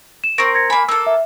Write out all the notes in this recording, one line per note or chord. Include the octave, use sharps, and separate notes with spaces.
E7
C4 A#4 C#6 A#6 D7
G#6 A#6 C#7
A#3 G#5 B5
A#3 A4 E6
E5